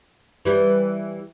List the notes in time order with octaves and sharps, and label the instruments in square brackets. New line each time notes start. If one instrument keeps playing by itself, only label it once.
[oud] E3 G3